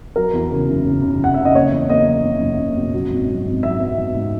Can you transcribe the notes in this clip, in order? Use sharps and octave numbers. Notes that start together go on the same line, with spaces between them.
F#3 A#4
E2
C#3
F#1
C#3
C#3
F#1 F#5
C#3 E5
D#5
A#3 C#5
E2
A#3 D#5
F#1
A#3
F#1
F#1
B2
F#3
G#1
F#3
G#1
F#3 E5
B3
G#1
G#2